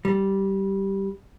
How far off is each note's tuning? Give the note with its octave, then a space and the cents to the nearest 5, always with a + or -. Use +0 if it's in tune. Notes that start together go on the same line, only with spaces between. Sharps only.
G3 -10